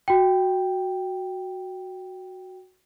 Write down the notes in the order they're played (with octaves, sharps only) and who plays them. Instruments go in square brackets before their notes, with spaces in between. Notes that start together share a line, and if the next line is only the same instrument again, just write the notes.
[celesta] F#4 G5